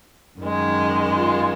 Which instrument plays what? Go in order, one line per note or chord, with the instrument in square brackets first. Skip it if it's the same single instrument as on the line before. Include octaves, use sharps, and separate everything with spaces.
[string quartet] F#2 D#3 G#3
F4